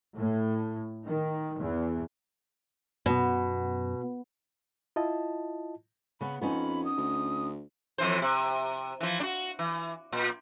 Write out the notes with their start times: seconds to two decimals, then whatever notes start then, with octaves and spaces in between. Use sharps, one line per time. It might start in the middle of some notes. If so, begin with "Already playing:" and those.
0.17 A2
1.05 D#3
1.57 E2
3.06 F#2 B2 B3
4.96 E4 F4 D#5 A5
6.21 C#3 B3 B5
6.42 F2 B3 C#4 D#4 B5
6.85 D#6
6.98 D2
7.98 F2 E3 C5
8.22 C3
9.00 E3 F3
9.20 D4 F#4
9.59 E3
10.12 A#2